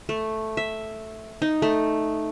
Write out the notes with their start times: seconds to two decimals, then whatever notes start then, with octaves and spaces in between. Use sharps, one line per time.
0.09 A3
0.57 E5
1.42 D#4
1.62 A3